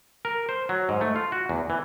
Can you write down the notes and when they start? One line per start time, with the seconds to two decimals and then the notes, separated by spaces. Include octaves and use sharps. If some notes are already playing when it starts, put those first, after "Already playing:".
0.25 A#4
0.49 C5
0.69 F#3
0.89 G#2
1.01 A3
1.16 F4
1.32 F#4
1.49 E2
1.70 E3